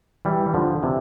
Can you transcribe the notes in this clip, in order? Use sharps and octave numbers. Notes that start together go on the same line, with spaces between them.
E3 G3
D3 F3
C3 E3